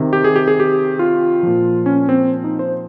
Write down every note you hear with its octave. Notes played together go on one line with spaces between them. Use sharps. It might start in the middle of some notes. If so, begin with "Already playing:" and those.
Already playing: C3 D#3
G4
G#4
G4
G#4
G4
F4
A#2 F3
C#4
C4
D#4
C5